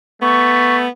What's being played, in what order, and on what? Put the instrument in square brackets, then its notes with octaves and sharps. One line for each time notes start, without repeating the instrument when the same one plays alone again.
[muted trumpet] A3 [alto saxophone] B3 [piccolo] C#6